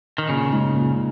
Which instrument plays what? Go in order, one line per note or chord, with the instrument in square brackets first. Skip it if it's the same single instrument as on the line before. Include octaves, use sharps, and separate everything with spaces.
[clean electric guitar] D#3
[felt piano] A#2 [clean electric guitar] C#3
[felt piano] G#3 D#4
A#2